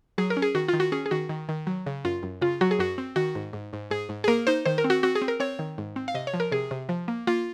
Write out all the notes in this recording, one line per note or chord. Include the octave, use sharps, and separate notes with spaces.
F#3 G#4
A#4
C#4
G#4
D#3 F#4
F4
D#3
F#4
C#4 G#4
G#4
D#3 F#4
D#3
D#3
F#3
C#3
F#2 F4
F#2
C#3 F4
F#3 F#4
G#4
F#2 F#4
C4
D#3 F#4
G#2
G#2
G#2
G#2 G#4
G#2
G#4
A#3 A#4
D#4 C5
D#3 C5
A#4
C4
F#4
C4 F#4
G#4
C4
A#4
C4 C#5
D#3
G#2
C4
F5
C3 D#5
C#5
F3
A#4
C3 G#4
C3
F3
A#3
A#3 F4